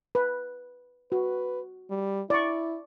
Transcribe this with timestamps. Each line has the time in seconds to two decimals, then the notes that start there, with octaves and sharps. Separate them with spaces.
0.15 B4
1.12 F#4 B4
1.90 G3
2.30 E4 D5 C#6